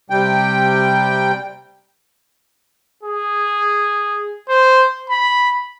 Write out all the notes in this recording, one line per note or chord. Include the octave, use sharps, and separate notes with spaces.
C3 G3 G5
G#4
C5
B5